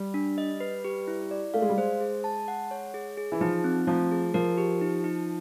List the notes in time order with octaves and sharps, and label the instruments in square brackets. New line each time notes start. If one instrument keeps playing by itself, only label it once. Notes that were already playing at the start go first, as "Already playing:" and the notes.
Already playing: [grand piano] G3
[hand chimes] D4
D#5
B4
G4
E4
D5
[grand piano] A3 [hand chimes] F5
[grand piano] G#3
G3
[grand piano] G#3 [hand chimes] C5
[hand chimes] G#4
A5
F#5
C#5
G#4
G#4
[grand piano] E3
[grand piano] F3 [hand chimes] D#4
[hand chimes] C4
[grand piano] F3 [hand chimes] A3
[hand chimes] G#4
[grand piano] F3 [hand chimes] A#4
[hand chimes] G4
D#4
D#4